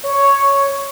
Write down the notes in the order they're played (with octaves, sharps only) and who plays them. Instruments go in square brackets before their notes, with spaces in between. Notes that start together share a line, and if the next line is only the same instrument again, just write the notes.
[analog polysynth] C#5